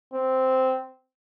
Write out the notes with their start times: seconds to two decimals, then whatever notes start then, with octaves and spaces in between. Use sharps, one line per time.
0.14 C4